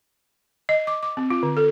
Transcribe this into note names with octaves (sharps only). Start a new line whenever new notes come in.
D#5
D6
D6
C4
F4
D3
A4